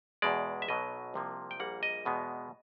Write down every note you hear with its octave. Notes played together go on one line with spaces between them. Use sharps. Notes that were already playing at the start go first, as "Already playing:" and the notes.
E2 B2 G#3 D5
E5
B1 B2 F#3 D#5
C2 C3 F3 A#3
G5
A#1 A#2 G3 A#3 F#5
D#5
E2 B2 G#3 B3